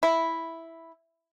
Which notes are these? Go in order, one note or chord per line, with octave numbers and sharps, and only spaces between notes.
E4